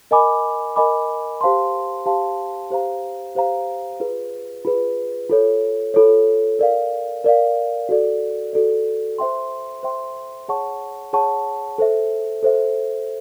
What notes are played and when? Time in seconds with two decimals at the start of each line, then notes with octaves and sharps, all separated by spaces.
0.11 A#4 D#5 G#5 B5 D6
0.76 A#4 D#5 G#5 B5 D6
1.41 G4 C5 F5 A5 C6
2.06 G4 C5 F5 A5 C6
2.70 G4 C5 F5 A#5
3.35 G4 C5 F5 A#5
4.00 F4 G#4 B4
4.65 F4 G#4 B4
5.29 F4 A4 C#5
5.94 F4 A4 C#5
6.59 A#4 D5 F5
7.24 A#4 D5 F5
7.89 F#4 A4 D5
8.53 F#4 A4 D5
9.18 C5 E5 G5 C6
9.83 C5 E5 G5 C6
10.48 G#4 C#5 F#5 A5 C#6
11.13 G#4 C#5 F#5 A5 C#6
11.78 A4 C5 E5
12.43 A4 C5 E5